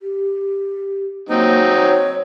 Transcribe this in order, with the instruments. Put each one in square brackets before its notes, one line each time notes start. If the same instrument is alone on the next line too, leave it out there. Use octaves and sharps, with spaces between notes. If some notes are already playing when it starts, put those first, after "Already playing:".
[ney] G4
[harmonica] F#3 C4 D#4 [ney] A#3
[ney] C#5